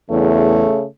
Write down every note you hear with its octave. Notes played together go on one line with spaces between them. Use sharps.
E2 C#3 A3